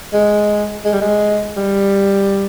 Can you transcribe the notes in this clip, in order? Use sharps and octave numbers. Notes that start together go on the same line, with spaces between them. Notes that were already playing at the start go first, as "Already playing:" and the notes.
G#3
G#3
G3
G#3
G3